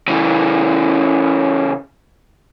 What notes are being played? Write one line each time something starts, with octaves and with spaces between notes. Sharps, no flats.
C#3 E3